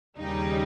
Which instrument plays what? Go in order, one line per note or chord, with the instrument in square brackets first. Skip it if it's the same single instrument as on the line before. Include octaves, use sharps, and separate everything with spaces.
[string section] D#2 C#3 G3 D#4